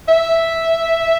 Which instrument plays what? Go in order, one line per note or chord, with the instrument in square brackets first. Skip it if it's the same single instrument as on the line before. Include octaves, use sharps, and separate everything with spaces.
[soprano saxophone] E5